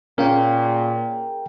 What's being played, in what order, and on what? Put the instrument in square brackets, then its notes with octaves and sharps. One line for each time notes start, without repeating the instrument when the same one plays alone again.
[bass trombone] A#2 [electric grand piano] C#4 [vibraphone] G#4 [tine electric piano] A#4 F5 G5